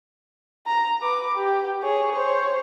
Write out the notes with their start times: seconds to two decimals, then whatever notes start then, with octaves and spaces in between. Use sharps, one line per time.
0.67 A#5
1.02 B4 D6
1.35 G4
1.83 G#4 C#5
2.12 C5 C#5